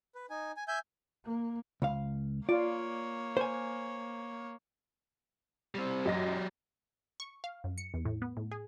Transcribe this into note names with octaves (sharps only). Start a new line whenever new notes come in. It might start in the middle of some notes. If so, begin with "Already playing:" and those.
B4
D#4 G#5
G#5
E5 G#5 G6
A#3
C#2 F5
A#3 F4 C#5 D5
C5 G#5
G3 C4
F#2 F#3 G4 D#5 A#6
C#6
F5
F#2
C#7
E2
A2
B3
A2
G#4